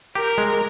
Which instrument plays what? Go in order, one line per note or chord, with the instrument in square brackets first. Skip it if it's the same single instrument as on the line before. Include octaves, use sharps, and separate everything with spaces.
[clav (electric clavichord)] G4 [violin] A#4
[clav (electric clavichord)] G#3